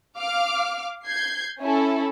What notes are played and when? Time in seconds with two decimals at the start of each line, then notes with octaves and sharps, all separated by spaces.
0.17 F5 D6 F6
1.05 G6 G#6 C7
1.60 C#4 E4 A4